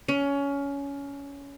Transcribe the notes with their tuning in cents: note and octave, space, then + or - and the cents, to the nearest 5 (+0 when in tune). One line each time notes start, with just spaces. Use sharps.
C#4 +20